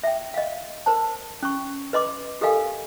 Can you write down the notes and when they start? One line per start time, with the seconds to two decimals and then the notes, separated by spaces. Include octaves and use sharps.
0.03 E5 G5
0.34 D#5 F5
0.86 A#4 C5 A5
1.43 C#4 C#6
1.93 B4 D#5 C6 D6
2.41 G4 A4 A#4 D#5 F5 G#5